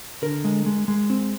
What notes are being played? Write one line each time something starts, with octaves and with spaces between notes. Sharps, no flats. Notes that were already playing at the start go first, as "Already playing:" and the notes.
D3 A#4
G#3
G#3
G#3
C4